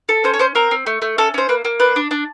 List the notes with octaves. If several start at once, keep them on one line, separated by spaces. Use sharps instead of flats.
A4
C#4 C5
C#5
C#4 C5
C4 A#4
C4
A3
A3
C#4 A4
C#4 C5
A#3 B4
A#3
D4 B4
D4
D4